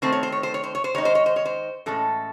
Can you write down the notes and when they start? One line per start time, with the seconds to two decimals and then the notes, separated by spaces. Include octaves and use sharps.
0.02 D#3 A3 C4 C5
0.12 C#5
0.23 C5
0.32 C#5
0.43 C5
0.54 C#5
0.64 C5
0.75 C#5
0.84 C5
0.94 D#3 G#3 D#4 C#5
1.05 C5
1.15 C#5
1.26 C5
1.36 C#5
1.45 C5
1.86 A2 E3 G#3 C#4 A4